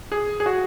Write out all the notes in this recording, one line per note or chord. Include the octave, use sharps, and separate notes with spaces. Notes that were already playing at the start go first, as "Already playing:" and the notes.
G#4
G#4
F#4